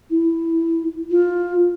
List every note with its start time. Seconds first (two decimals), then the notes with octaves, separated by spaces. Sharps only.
0.11 E4
1.11 F4